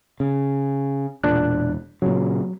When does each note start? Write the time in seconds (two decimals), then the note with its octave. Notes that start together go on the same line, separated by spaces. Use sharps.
0.20 C#3
1.24 E1 A#2 D4 F#6
2.02 A#2 C#3 F#3